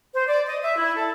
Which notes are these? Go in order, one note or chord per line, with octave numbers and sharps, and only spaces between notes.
C5
D5
D#5
E5
E4
A4